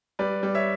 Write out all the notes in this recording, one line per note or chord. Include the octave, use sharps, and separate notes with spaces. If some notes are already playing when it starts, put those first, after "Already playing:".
G3 B4 D5
G3 D5
C#5 E5